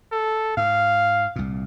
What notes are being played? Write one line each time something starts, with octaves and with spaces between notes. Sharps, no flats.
A4
G#2 F5
C2 A#2